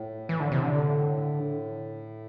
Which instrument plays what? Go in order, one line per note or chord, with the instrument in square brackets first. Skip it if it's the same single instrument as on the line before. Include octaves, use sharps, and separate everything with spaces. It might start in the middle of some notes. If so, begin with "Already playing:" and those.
Already playing: [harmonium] A2
[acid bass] E3
D3
C3
D3
[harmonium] G2
A2